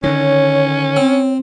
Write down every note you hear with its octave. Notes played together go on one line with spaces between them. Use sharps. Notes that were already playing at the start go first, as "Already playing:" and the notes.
D3 D#3 C#4 C#5
C4